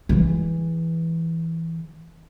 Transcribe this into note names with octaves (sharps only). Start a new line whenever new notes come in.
E3 G#3